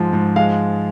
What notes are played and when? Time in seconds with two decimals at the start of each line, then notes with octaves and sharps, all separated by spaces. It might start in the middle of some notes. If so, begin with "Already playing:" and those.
Already playing: G#2 F3 G#3
0.13 G#2
0.36 G#3 F5